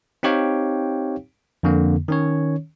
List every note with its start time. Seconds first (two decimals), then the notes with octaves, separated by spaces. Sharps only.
0.23 C4 D#4 G4 C#5 F5 G5
1.63 F2 D3 A#3
2.08 D#3 C#4 C#5